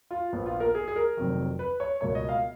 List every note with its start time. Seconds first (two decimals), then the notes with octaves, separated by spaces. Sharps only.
0.11 F4
0.33 A#1 A#2 F3 B3
0.46 F4
0.60 A#4
0.75 G#4
0.88 G#4
0.96 A#4
1.17 F1 F2 D#3 F#3
1.59 B4
1.80 C#5
2.01 C#2 B2 A#3 C#5
2.15 D#5
2.29 F5